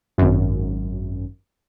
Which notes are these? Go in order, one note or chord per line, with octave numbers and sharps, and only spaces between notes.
G#1 F#2